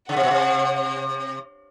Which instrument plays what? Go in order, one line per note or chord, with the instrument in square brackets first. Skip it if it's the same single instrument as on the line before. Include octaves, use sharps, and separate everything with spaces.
[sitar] C#3 [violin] F#5
[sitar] C3
B2
C3